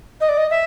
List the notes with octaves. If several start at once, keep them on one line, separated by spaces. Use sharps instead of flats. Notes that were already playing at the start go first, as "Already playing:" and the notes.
D#5
D5
D#5
E5